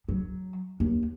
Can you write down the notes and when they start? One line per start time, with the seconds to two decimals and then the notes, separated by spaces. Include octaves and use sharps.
0.08 F#3
0.80 D#2